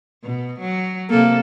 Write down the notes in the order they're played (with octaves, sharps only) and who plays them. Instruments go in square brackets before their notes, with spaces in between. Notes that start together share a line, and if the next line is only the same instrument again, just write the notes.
[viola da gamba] B2
F#3
[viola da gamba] C3 A4 [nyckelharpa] A#3